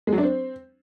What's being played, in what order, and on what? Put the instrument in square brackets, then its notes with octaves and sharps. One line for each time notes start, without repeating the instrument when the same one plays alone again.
[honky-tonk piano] G#3
F#3
D4
C4